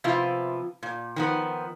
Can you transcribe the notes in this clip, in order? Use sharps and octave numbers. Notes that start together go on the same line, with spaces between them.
C3 F3 B3 E4 F4
A#2
D#3 F3 B3